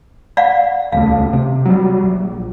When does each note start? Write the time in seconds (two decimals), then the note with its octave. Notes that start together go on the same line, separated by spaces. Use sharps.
0.37 D5 F5 F#5
0.92 D#1 C#2 A3 F5
1.33 C3
1.65 F#3 G3
2.03 A#1